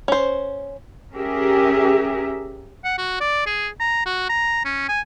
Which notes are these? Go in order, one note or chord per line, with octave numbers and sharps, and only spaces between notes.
C#4 C5
C#4 G4 G#4 A#4 E5
F#5
F#4
D5
G#4
A#5
F#4
A#5
C#4
G#5